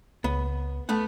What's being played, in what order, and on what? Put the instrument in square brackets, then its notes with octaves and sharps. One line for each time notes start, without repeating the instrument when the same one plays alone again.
[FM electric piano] C#2 [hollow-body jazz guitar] B3
[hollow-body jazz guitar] A3 B3 F#5